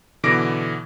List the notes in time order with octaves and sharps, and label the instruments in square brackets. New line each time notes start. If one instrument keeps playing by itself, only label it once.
[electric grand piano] B2 D3 E3 D6 A#6 D7